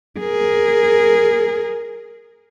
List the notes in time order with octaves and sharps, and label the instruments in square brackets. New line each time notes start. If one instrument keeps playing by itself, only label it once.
[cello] G#4 A#4